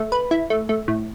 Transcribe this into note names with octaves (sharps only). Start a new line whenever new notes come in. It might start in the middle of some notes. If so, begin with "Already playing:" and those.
Already playing: A3
B4
E4
A3
A3
A2